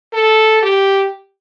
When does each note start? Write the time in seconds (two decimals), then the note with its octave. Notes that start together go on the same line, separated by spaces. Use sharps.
0.13 A4
0.63 G4